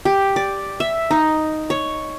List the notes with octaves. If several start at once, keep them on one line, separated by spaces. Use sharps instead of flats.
G4
D5
E5
D#4
C#5